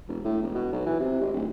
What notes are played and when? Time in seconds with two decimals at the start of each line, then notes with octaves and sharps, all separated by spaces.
0.08 E1
0.24 A2
0.42 E1
0.55 B2
0.73 B1
0.86 E3
1.00 C3
1.21 G#1
1.33 D1